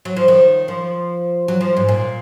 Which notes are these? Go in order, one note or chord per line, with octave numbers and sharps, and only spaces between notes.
F#3
F3
D#3
F3
F#3
F3
G#2
A#2